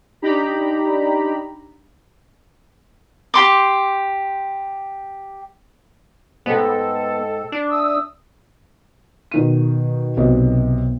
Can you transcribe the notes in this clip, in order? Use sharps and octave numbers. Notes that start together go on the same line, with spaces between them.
D4 D#4 G4 A#5 B5
G4 C6 D6
G#2 G#3 B3 A4 G5
D4
E5 D#6 E6
B2 D#3 D#7
B1 C3 D#5